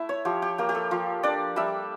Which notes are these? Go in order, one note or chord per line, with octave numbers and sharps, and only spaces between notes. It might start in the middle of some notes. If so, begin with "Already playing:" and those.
Already playing: A3 E4 E5
C#5
F3 G4
G4
A#3 G4
G4
A4
F3
D4 D5
G3 E5